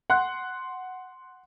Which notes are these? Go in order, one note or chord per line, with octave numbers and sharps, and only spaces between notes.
F#5 C6 F#6